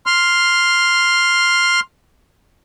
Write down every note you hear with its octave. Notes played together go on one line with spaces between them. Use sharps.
C6 F6